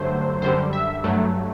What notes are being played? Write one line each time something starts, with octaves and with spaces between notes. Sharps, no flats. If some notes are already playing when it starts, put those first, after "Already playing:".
Already playing: G2 D3 F#3 A3 C5
F#2 D3 G3 C5
E5
G2 F#3 A3